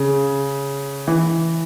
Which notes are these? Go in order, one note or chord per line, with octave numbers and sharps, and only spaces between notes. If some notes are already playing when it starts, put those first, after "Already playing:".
Already playing: C#3
E3